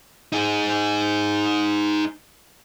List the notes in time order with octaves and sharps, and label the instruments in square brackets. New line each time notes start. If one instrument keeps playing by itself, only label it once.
[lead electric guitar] D#4 G#4